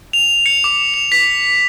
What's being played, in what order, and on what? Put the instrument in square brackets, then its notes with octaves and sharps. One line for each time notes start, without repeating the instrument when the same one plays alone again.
[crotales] F7
C#7
D6
F7
B6